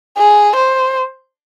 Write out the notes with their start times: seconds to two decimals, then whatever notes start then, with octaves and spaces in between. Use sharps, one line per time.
0.18 G#4
0.56 C5